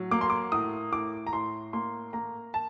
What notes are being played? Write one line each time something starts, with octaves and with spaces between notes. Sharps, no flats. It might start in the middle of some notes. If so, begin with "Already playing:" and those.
Already playing: A2 F#3
A#3 D6
C6
D6
A2 D#6
A2 D6
A#5
A2 C6
A#3 C6
A#3 A#5
A5